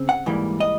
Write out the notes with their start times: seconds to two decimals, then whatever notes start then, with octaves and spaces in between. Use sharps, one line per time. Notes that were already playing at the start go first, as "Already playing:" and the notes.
Already playing: C#3 C4
0.09 F#5
0.26 G#2 E3 G3 A#3
0.60 D#5